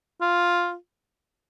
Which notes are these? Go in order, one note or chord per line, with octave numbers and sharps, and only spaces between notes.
F4